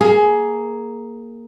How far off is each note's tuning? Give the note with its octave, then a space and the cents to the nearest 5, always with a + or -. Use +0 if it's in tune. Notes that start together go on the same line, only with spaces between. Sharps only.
A#3 +0 G#4 +10